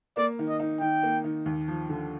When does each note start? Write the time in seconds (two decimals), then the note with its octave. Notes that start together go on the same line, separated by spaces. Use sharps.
0.17 A#3 D5
0.39 D#3
0.49 D#5
0.60 D#4
0.81 D#3 G5
1.03 A#3
1.24 D#3
1.46 D#2
1.68 F3
1.89 D3